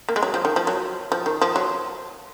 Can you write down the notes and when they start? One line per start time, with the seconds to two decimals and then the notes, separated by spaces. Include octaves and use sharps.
0.09 A#3
0.16 G#3
0.23 F#3
0.34 F3
0.45 D#3
0.56 F3
0.67 F#3
1.12 F3
1.26 D#3
1.41 F3
1.56 F#3